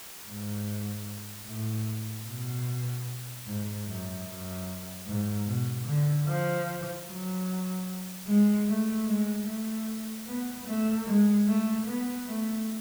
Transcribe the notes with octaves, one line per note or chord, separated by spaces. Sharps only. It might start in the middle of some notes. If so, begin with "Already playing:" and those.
G#2
A2
B2
G#2
F#2
F#2
G#2
B2
D3
F3
F#3
G#3
A3
G#3
A3
B3
A3
G#3
A3
B3
A3